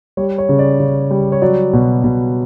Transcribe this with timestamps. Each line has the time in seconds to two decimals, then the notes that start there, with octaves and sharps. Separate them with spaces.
0.17 G3 C#5
0.38 C#5
0.49 C#3
0.59 D5
0.80 C#3
1.11 G3
1.32 C#5
1.42 F#3 D5
1.73 B2
2.04 B2